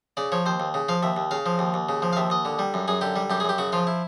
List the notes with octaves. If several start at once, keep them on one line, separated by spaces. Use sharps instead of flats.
C#3 D5
F3 C#5
D#2 C5
D#2
C#3
F3 F5
D#2 E5
D#2
C#3 F5
F3
D#2
D#2
C#3
F3
F5
D#2 E5
D#2 D#5
D3
G3
F#2
F#2 G#4
D3 G4
G3
F#2 G4
G#4
F#2 G4
C#3 F#4
F3 F4
E4